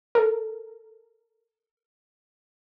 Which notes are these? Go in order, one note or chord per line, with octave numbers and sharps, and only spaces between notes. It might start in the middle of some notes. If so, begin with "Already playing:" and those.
A4 A#4